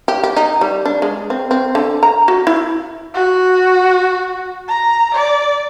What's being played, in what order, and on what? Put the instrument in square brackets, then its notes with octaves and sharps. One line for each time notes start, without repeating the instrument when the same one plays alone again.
[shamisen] G4
G4
D#4
G3
D4
G#3
C4
C4
D3
A#5
F#4
E4
[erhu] F#4
A#5
D5